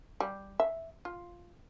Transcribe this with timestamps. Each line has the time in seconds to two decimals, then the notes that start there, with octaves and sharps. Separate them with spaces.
0.20 G3
0.60 E5
1.05 F4